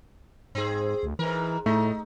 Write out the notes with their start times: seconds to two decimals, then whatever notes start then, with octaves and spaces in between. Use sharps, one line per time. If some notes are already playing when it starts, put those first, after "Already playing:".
0.55 G#2 C4 G#4
1.03 D2
1.19 G#2 E3 A#4
1.66 A2 A3 D#4